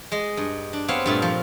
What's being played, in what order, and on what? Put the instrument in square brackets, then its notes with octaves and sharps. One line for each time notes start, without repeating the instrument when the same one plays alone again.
[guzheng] G#3 D#5
G2
D4
B3 C4 C#5 F5
G2 A#2 A3
F3